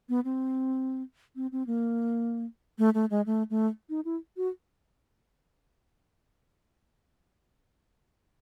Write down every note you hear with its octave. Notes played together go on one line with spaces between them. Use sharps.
B3
C4
C4
C4
A#3
A3
A3
G#3
A3
A3
D#4
E4
F#4